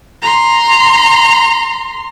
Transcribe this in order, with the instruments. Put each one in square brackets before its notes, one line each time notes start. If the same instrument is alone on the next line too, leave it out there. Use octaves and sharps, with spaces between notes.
[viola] A#5 C6